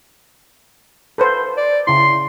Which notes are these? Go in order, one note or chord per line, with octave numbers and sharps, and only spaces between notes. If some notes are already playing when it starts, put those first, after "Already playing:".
A4 B4 C5
D5
C#3 E4 C6